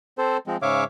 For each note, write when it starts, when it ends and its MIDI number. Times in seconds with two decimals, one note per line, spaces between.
0.18 0.37 60
0.18 0.37 69
0.18 0.37 72
0.47 0.57 53
0.47 0.57 56
0.47 0.57 60
0.62 0.84 44
0.62 0.84 49
0.62 0.84 73
0.62 0.84 76
0.62 0.84 77
0.62 0.84 86